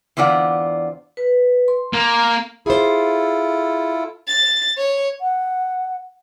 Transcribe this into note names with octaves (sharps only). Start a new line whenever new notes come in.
E2 D3 C4 F4 D5 F#5
B4
C6
A#3
E4 F4 G#4 A4 C5
A6
C#5
F#5